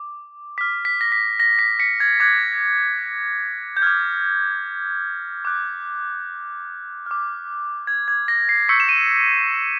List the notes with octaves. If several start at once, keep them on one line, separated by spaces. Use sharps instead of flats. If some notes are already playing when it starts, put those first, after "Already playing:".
Already playing: D6
D6 F6 B6
B6
A#6
B6
A#6
B6
B6 C#7
G#6
D6 F#6 G#6
G6
D6 F6 G#6
D6 F#6
D6 F6
G#6
G#6
A#6
C7
C#6 E6 G6 B6 C#7
E7
D#7